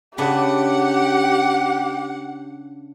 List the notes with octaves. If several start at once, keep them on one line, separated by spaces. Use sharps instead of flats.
C#3 D4 G4 B4 F#5